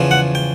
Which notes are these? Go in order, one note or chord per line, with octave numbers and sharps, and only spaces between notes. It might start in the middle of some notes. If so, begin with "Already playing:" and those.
Already playing: E2 C#3 F3
F#5
G5